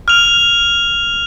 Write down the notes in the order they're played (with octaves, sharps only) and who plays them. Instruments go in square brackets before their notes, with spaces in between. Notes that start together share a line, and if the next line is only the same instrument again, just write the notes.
[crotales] F6 F7